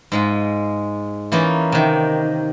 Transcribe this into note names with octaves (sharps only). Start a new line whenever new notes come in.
G#2 G#3 F4
E3 A#3 C#4 D#4 F4
C3 D#3